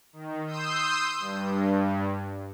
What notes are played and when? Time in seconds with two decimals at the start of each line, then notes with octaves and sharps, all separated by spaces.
0.13 D#3
0.46 C6 D#6 E6 G6
1.20 G2